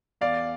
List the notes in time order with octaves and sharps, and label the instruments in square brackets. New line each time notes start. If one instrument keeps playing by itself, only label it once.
[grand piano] E2 D5 F5